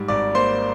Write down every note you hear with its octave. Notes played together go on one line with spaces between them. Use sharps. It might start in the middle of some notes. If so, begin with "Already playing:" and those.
Already playing: G#2 G3
G#1 D5 D6
A#3 C5 C6